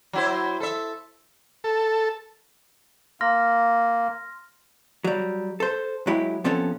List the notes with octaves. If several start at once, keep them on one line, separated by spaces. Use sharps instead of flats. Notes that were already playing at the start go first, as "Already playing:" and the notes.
F#3 E4 C5
A4 E5
A4
A#3 C6 F6 A#6
F#3 G3
A4 C5
F#3 G#3 E4 G4
C3 F3 B3 C#4 A4